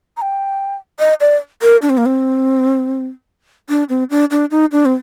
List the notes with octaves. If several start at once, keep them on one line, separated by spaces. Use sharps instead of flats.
A#5
G5
D#5
D5
A#4
D4
C4
A#3
C4
D4
C4
D4
D4
D#4
D4
C4